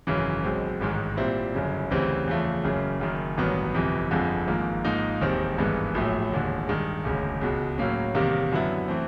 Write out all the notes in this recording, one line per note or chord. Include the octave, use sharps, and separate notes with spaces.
G#1 F#2 C#3 E3
B1 B2 G#3 C4
A1 G#2 D#3 G#3
A#2 G3 C4 E4
G1 F#2 C#3
D2 C#3 E3 G3 C4
E2 C#3 F3 A3
F#1 F#2 C#3
F#1 F#2 D#3
A1 G2 D#3 F#3 B3
G1 F2 C3 E3
G1 F2 D3 F3 G#3
G#1 G#2 F3 A#3
G#2 F3 A#3 D#4
E1 D#2 D#3 G3 C4
G#1 G2 E3 G#3 B3
A#1 A2 F#3 A3
E1 D#2 D3
G2 D#3 G#3
E1 D2 C#3
C#2 B2 G#3
A2 F#3 A#3 C#4
E2 C3 D#3 G3 A#3
F#2 D3 F#3 B3 E4
E3 A3 C4